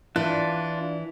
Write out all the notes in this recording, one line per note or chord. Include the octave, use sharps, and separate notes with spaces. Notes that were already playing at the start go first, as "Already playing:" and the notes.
E3 D4 F4 F#6